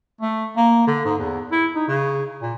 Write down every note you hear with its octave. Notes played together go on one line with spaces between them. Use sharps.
A3
A#3
D3
G#2
E2
E4
D#4
C#3
A#2